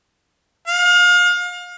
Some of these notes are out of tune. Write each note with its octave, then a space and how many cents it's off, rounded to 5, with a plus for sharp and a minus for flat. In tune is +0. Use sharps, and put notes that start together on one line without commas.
F5 +35